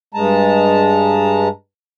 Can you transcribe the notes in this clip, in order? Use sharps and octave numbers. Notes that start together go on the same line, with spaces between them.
G2 G#3 A5 A#5